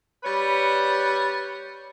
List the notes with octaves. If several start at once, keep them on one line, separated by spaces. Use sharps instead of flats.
G3 B4 C#5